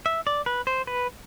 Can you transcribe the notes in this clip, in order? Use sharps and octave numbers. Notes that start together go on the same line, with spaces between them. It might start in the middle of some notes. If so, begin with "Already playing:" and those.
E5
D5
B4
C5
B4